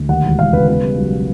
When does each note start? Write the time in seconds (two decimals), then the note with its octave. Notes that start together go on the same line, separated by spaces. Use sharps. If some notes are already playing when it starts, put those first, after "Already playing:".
Already playing: D2
0.09 D#2 F#5
0.24 E1
0.39 E1 F5
0.53 C#3 B4
0.68 B2 B4
0.83 G3
0.98 B1